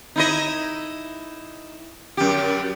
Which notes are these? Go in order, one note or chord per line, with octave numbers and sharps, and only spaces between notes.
D#4 E4 D#5
F#2 G4